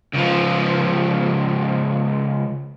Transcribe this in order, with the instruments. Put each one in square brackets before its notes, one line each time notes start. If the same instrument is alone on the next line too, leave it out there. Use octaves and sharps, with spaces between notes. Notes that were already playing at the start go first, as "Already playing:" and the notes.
[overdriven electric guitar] C#2 F3